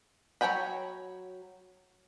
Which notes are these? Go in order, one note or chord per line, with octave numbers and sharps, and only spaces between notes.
F#3 A#4 C#5 G5 B5